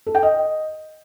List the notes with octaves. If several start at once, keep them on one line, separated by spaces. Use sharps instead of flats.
A4
G5
D#5